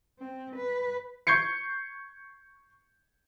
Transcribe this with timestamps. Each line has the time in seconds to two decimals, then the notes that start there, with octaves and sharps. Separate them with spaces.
0.20 C4
0.56 B4
1.27 C#6 G6 G#6 C7 C#7